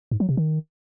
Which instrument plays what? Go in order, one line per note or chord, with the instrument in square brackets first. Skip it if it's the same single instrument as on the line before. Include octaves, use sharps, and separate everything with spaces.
[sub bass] G#2
F#3
C3
D#3